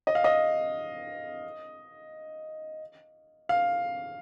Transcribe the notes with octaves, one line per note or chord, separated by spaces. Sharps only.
D#5
F5
D#5
F5